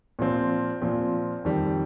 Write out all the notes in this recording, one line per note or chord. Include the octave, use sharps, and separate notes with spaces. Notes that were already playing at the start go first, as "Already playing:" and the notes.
A#2 F3 C4
A#2 F3 C4
F2 D#3 G3